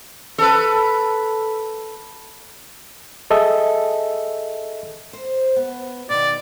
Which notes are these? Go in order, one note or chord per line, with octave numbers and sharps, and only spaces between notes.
A4 B4
G#4 A4 D#5 E5
C5
B3
B2 D#3 D5